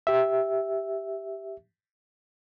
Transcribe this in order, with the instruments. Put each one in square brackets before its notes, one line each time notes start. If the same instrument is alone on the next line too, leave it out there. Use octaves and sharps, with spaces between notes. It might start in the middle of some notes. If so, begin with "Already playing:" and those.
[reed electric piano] G4 E5